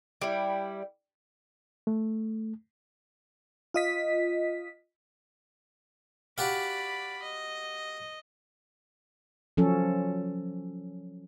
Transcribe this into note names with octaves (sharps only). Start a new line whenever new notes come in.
G3 E4
A3
F4 D#5 B6
F#4 G4 D5 F5 B5
D#5
F3 F#3 C#4 A4